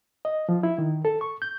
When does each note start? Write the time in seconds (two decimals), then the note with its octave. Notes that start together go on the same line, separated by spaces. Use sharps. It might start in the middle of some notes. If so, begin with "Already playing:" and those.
0.25 D#5
0.49 F3
0.63 E4
0.78 D#3
1.05 A4
1.21 C#6
1.42 G6